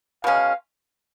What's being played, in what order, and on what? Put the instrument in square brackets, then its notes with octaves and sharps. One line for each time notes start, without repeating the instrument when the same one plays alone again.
[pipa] B2 G#3 C#4 [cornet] F5